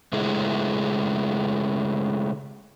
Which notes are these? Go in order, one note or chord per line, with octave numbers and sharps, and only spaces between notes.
C#3 G#3 A3 E4 G#4